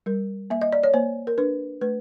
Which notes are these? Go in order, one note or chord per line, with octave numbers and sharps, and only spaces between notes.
G3 A#4
A#3 E5
D#5
D5
C#5
A#3 C5
A#4
D4 B4
A3 B4